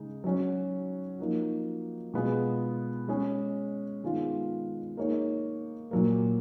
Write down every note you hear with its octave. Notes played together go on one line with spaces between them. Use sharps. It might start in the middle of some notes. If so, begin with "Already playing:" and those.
Already playing: C#3 G#3 D#4
F#3 C#4 F#4
F3 A#3 D#4 F#4
B2 G#3 B3 F4 G#4
G#3 C#4 G#4
D#3 G#3 B3 F4
A#3 D#4 G#4 C#5
A#2 F#3 A#3